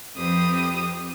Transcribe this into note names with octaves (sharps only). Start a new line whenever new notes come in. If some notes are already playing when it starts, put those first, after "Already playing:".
F2 C4 G4 B4 D#6